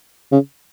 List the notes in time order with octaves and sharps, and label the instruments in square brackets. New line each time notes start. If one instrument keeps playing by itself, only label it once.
[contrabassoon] C#3